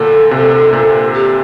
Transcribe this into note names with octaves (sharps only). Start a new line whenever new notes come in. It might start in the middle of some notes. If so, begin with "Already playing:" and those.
Already playing: A#2 D3 A4
C3
A#2
G4